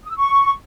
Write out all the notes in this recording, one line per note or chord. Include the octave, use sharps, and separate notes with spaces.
D#6
E6
C#6